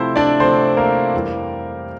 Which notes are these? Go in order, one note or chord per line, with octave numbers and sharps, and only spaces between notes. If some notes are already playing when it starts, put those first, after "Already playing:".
Already playing: C3 F3 A3 C4 E4 C5
D4 D5
C3 F3 A3 C4 C5
A#3 A#4
F2 E3 G3 A#3